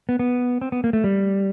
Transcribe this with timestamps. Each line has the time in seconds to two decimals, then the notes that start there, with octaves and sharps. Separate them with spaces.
0.09 B3
0.19 B3
0.61 C4
0.72 B3
0.84 A#3
0.93 A3
1.04 G3